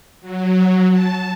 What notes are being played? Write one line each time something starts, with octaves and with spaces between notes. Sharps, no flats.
F#3
A5